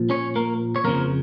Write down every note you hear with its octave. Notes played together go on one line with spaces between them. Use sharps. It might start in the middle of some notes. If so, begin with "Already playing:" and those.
Already playing: A#2 F3
C#4 C#5
A#3 A#4
C#5
F2 C#3 F3 A#3 A#4